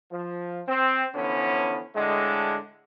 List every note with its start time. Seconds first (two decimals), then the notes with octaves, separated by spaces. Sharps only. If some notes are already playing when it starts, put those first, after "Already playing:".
0.12 F3
0.68 C4
1.15 D3 E3 F3 B3 C#4
1.96 A2 D3 G#3